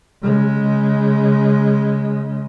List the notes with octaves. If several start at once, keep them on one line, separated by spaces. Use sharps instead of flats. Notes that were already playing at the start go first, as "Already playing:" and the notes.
C#3 G#3